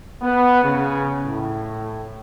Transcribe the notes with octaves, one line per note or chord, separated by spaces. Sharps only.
B3
C#3
A2